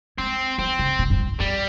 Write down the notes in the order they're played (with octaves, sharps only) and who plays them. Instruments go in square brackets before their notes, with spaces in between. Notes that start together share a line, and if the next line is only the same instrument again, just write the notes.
[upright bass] G#3 [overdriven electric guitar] C4
[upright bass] F3 [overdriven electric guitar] C4
[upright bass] C#3
A#2
G2
G#2
[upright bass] G2 [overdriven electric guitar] G3